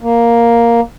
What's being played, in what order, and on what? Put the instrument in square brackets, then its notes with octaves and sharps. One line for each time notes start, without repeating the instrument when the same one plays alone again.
[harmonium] A#3